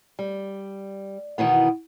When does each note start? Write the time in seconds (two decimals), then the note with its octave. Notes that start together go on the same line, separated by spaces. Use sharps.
0.19 G3
1.38 B2 D#3 E3 B3